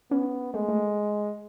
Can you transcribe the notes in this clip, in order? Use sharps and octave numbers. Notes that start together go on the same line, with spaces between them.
B3 C#4
G#3 A3
A3